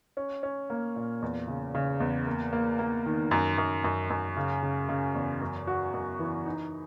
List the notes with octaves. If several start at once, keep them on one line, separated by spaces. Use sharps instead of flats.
C#4
C#4
A#3
A#2
E2
C#3
C#3
E2
A#3
A#3
A#3
D#3
F#2
F#2
F#2
F#2
C#3
C#3
C#3
E2
F#2
F#4
F#2
E3
D#4